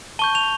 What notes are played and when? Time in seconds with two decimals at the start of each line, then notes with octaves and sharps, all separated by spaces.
0.19 A5 C#6 G6 G7
0.35 F7